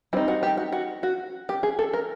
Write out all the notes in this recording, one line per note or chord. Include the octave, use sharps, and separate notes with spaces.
G3 C4 D#4 E4
F#4
G4
F#4
F#4
F#4
G4
G#4
A4
A#4